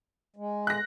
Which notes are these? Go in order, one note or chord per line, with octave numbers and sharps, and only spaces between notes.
G#3
F#6 A#6